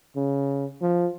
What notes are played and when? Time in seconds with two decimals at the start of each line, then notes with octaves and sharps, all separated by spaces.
0.16 C#3
0.82 F3